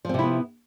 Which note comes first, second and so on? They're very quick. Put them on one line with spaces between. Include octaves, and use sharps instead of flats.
F3 C4 C3 E4 B3